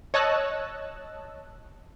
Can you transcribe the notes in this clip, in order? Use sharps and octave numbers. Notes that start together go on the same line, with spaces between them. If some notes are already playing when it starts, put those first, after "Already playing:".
C#5 D#5 A5 E6 F#6